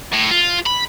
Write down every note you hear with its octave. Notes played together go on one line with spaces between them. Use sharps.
A2
F4
B5